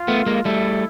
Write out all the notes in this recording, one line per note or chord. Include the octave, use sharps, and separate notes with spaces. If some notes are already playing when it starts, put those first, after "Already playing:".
Already playing: F4
A3 B3
G#3 A#3
G3 A3 E4